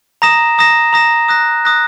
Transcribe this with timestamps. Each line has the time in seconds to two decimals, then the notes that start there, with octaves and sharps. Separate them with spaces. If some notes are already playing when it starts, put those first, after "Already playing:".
0.22 A#5 D#6 A#6 E7
0.58 A#5 D#6 A#6 E7
0.93 A#5 D#6 A#6 E7
1.28 D#6 F#6 A#6
1.65 D#6 F#6 A#6